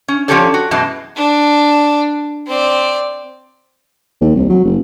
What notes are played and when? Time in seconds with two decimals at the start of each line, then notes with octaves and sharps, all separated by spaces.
0.08 C#4
0.28 F3 C#4 D4 G4 A4 C#5
0.54 F#4
0.71 F#2 B2 E3 G#3 A5
1.16 D4
2.47 C4 D5
4.21 D#2
4.35 C2
4.49 F#3
4.65 F#1